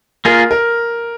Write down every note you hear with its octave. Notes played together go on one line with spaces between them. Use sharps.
A#3 F4 G#4 A#4
A#4